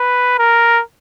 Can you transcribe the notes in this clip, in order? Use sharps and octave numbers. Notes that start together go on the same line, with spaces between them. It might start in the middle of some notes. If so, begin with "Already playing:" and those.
Already playing: B4
A#4